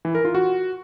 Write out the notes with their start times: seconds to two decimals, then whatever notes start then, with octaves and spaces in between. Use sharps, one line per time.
0.05 E3
0.15 A#4
0.25 F4
0.35 F#4